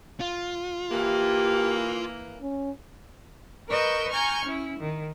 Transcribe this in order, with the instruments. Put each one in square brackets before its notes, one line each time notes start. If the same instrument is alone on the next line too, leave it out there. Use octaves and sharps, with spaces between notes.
[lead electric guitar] F4
[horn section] E3 A#3 [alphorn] G4
[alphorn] C#4
[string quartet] A#4 B4 D#5 C#6 E6 G6
G#5 A#5 C#6 F6 G6 G#6
C#4 E4
D#3